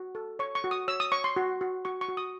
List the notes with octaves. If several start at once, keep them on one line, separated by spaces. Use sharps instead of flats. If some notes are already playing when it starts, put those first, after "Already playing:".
Already playing: F#4
A4
C#5 C#6
C#6
F#4
D#6
C#5 E6
D#6
C#5 C#6
C6
F#4
F#4
F#4 C#6
C#6
F#4
D#6